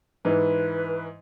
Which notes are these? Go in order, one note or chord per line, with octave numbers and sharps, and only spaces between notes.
G#2 E3 B4